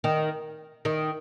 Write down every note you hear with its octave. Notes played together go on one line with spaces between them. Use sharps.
D#3
D#3